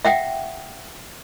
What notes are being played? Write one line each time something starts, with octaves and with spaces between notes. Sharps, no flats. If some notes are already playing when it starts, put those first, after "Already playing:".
E5 F#5 G5